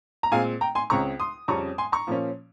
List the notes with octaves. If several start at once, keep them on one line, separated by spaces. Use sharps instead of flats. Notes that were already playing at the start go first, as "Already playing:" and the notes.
A#5
A#2 G#3 C4 F5 G#5
G5 A#5
G#5 C6
C#2 C#3 G#3 C4 A#5 C#6
C6 D#6
F2 C#3 G3 C#4 A#5 C#6
G#5 C6
A#5 C#6
A#2 F3 A#3 C#4